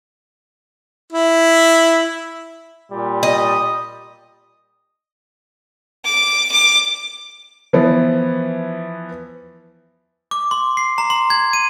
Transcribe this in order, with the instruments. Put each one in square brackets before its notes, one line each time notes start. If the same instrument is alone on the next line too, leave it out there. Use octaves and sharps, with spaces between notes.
[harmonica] E4
[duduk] A#2 [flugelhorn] G3
[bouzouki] D#5
[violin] D6
D6
[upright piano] E3 F3 B3
[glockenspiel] D6
C6
C7
A#5
C6
G#6
D#7